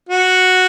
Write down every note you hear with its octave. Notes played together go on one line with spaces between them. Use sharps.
F#4